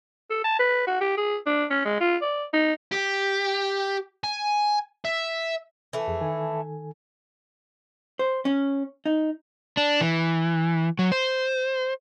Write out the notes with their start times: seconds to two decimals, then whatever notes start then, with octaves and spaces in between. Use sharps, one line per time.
0.30 A4
0.44 A5
0.59 B4
0.87 F#4
1.01 G4
1.17 G#4
1.46 D4
1.71 C#4
1.85 G#3
2.01 F4
2.22 D5
2.53 D#4
2.92 G4
4.24 G#5
5.05 E5
5.93 E3 A3
6.08 F2 G#4
6.21 D#3 A4 G#5
8.19 C5
8.45 C#4
9.06 D#4
9.77 D4
10.01 E3
10.99 F#3
11.12 C5